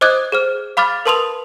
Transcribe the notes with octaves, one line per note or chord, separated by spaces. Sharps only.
C5 D#5 D6 D#6 F#6 G#6
G#4 C5 F6
F5 B5 D6 F6 A6
A#4 B4 A5 C6 D#6 F7